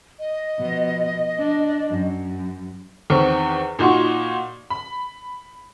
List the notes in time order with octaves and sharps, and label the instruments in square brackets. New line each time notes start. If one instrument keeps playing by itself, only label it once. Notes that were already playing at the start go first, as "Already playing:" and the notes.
[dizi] D#5
[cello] B2 F3
D4
F#2
[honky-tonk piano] E2 D#3 C4 C#6
A#2 D#4 F#4 C6 C#6
B5